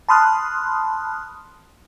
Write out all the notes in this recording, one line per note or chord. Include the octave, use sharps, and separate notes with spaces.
A5 B5 C6 D#6 F6 F#6